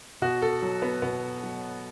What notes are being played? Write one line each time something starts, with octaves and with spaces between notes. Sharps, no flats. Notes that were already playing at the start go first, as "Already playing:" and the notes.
B2 F#4
A4
F#3
B3
B2 B3
F#3